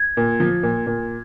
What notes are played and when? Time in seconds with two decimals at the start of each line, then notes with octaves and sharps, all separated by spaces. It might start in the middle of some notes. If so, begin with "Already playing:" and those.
Already playing: G#6
0.17 A#2
0.40 F3
0.63 A#2
0.87 A#2